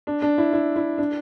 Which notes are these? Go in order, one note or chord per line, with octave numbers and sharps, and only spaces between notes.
D4
D4
E4
E4
E4
D4